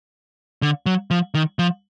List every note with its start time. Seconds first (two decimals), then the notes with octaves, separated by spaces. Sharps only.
0.62 D3
0.86 F#3
1.11 F3
1.34 D#3
1.59 F3